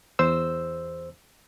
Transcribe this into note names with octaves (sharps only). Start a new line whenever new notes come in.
E2 C5 E6